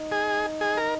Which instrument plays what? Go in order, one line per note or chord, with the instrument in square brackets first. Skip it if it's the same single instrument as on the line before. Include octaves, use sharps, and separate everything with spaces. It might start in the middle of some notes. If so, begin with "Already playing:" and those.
Already playing: [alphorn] D#4
[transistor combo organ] G#4
G#4
A#4